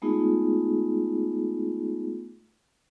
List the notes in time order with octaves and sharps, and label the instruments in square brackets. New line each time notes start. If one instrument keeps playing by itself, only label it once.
[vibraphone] G#3 A3 B3 D#4 F4 G#4